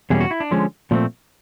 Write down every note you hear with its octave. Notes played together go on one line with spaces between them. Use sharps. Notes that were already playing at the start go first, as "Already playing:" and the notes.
E2 B2 G3 A#3 C#4 G#4
F#4
E4
D4
D3 F3 G#3 C#4
A#2 F3 A3 C4